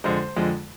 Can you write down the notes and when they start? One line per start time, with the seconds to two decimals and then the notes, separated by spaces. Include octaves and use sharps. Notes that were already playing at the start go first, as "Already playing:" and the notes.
0.04 F2 D3 F3 G#3 C5
0.36 F2 D3 F3 G#3